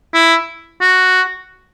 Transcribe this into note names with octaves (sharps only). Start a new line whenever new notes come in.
E4
F#4